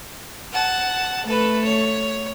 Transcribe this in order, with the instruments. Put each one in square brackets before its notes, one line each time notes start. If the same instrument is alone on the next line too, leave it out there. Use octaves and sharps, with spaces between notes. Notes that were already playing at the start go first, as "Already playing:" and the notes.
[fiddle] F#5 A5
[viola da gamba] A3 [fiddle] A4 B4
[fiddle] C#5